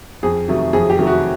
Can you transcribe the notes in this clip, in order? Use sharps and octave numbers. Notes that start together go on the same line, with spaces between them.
F2 G#4
C3 D#3 F#3 A3
F2 G#4
G4
C3 D#3 F#3 A3
F#4